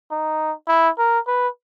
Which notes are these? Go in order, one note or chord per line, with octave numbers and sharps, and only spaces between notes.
D#4
E4
A#4
B4